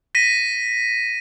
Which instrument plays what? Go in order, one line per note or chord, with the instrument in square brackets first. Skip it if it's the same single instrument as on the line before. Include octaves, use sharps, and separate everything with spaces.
[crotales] A#6 B6 D#7